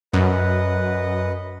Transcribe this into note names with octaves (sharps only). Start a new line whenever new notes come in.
F#2 B4 D#5 F#5